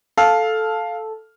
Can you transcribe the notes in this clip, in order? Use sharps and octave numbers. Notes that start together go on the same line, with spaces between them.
A4 F5